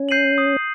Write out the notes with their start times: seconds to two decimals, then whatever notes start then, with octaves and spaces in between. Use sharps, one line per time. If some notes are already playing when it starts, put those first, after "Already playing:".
Already playing: C#4
0.09 G6 C7 D#7 F#7
0.38 D#6